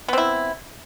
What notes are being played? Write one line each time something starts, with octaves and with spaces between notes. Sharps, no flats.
B3 C4 E4